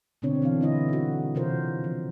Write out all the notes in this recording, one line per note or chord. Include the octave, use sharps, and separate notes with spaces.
B2 D3 C4 D4 C#5
E3 C4 F5
D3 G3 E4 D#5
D#4 F#4
C3 E3 F4 A#4 C5
F3